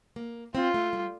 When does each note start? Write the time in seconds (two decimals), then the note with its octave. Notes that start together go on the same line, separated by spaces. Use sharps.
0.16 A#3
0.55 C4 F4
0.74 A3
0.93 G3